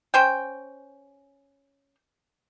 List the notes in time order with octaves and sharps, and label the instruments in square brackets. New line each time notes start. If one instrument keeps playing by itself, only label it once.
[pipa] C#4 C5 G5